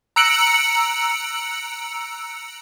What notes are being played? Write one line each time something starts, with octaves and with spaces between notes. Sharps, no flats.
A#5 E6 F#6 C#7 D7 F#7